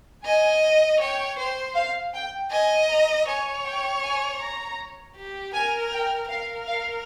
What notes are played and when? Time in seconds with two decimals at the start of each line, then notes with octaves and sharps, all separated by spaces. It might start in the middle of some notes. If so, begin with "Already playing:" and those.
0.25 D#5 G#5
1.00 C#5 G5
1.39 C5
1.76 F5
2.14 G5
2.51 D#5 G#5
2.89 A#5
3.27 C#5 G#5
3.64 G5
4.03 G#5
4.40 A#5
5.17 G4
5.54 A#4 G#5
5.91 G5
6.29 A#4 F5
6.67 F5